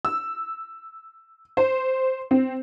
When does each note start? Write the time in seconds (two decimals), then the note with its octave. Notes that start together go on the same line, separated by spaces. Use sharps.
0.05 E6
1.57 C5
2.31 C4